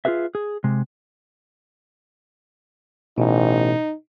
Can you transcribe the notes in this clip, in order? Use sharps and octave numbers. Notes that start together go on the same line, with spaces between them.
F4 G4 G#4 B4 E5
G#4
C3 G#3
A1 B2 D#4